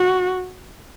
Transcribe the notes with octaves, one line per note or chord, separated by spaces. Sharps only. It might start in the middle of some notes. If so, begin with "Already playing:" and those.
Already playing: F#4